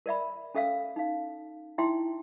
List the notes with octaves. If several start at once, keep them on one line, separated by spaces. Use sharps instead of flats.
A#4 D5 E5 B5
C#4 A4 E5 F5 E6
D#4 F5
D#4 E4 E5 G5 C6